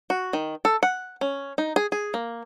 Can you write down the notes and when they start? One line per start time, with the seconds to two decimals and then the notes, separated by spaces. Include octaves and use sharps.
0.10 F#4
0.33 D#3
0.65 A4
0.83 F#5
1.21 C#4
1.58 D#4
1.76 G#4
1.92 G#4
2.14 A#3